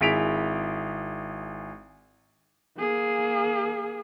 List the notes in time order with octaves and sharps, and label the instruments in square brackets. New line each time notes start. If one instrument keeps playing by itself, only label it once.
[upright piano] G#1 E4 G#4 B6 D7 F7
[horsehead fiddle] A#3 G#4